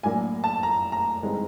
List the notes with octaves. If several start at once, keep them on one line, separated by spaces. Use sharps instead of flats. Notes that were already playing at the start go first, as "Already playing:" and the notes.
A2 F#3 A#3 D4 G#5
A5
A#5
A#5
G2 E3 G#3 C4 D#4